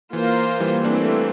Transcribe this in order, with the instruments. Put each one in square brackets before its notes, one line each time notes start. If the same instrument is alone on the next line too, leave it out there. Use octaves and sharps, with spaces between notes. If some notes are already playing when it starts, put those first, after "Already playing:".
[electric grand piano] E3 [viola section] A#3 F4 C5
[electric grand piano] E3 G3
[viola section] E3 A3 C4 [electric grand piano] A#3 D4